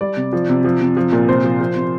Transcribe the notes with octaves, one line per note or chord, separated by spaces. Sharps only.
G3 D5
C3
F3
C3
F3
C3
F3
A#2
C3 C5
F3
F3
C3